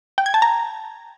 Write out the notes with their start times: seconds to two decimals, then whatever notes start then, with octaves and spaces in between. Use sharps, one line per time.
0.18 G5
0.26 G#6
0.34 A5
0.42 A#5